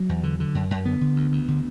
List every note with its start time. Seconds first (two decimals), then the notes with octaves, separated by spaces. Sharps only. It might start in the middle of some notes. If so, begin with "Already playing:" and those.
Already playing: F#3
0.09 E2
0.23 D3
0.40 D3
0.55 F#2
0.71 F#2
0.85 D3 B3
1.01 D3
1.16 D2
1.32 D2
1.48 D3